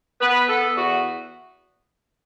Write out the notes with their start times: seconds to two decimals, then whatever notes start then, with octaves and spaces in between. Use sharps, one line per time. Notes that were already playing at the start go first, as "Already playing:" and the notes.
0.21 B3 B4
0.49 B3 A4
0.76 E2 F#4